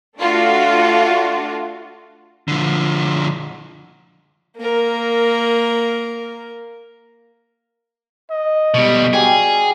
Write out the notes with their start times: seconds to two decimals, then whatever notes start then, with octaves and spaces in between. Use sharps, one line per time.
0.20 A3 D4 F4 F#4
2.48 D3 F3
4.57 A#3 A#4
8.31 D#5
8.74 B2 G3
9.13 G3 F#4 G#4 D5